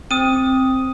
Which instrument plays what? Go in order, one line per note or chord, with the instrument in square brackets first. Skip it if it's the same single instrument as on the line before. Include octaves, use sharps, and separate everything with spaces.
[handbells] C4 [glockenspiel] D#6 D#7